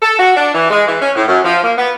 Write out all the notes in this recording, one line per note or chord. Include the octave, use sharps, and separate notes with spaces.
A4
F#4
D4
E3
G#3
E3
C#4
A2
F#2
F3
A#3
B3